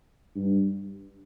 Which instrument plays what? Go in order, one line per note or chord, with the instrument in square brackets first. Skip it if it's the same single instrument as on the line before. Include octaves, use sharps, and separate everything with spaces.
[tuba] G2